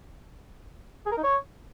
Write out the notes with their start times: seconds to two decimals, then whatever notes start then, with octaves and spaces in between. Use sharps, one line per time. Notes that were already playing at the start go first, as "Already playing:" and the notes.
1.06 G#4
1.12 A#4
1.17 D#4
1.23 C#5